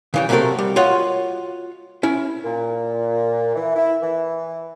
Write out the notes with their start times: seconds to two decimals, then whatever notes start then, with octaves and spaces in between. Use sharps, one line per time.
0.14 C#3 E3 G3
0.29 C3 F#3 A3 C4 A4 A#4
0.58 G3
0.76 F4 F#4 C#5 D#5 F#5
2.03 C#4 E4
2.44 A#2
3.55 E3
3.76 E4
4.02 E3